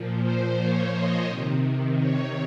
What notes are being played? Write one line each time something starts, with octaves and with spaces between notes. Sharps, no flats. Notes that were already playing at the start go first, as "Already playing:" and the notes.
Already playing: A#2 F3
C5
C#5
D#5
C3 D#3
C#5